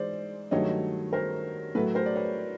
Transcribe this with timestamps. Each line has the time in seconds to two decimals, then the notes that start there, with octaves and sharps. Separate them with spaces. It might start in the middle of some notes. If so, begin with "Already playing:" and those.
Already playing: G#2 E3 G#3 C5 D5
0.51 G2 D#3 F#3 A3 C#5 D#5
1.13 A#4 C5
1.75 A2 F#3 A3 A4 B4
1.95 A#4 C5
2.06 D5
2.16 B4 C#5